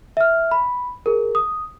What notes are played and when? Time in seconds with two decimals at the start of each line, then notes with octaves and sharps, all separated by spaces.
0.17 E5 F6
0.51 B5
1.06 G#4 A#4
1.35 D#6